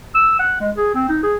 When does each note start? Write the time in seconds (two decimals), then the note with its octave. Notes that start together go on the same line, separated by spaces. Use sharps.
0.15 E6
0.39 F#5
0.60 G#3
0.77 G#4
0.94 C4
1.09 D#4
1.23 G#4